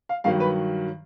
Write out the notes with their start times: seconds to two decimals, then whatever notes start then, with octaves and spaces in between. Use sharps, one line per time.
0.09 F5
0.24 G2 D#3 F#3 F5
0.40 B4